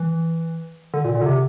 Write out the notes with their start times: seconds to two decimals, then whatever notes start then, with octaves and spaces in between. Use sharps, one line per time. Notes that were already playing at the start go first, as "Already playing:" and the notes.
Already playing: E3
0.94 D3
1.05 A#2
1.15 A#2
1.21 D3
1.26 C3